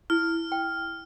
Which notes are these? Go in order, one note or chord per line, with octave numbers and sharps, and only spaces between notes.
E4 F6
G5